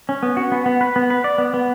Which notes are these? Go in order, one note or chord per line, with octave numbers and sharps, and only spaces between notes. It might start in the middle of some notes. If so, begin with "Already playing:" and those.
C#4
B3
F#4
B3
B3
B4
B3
B4
D5
B3
B3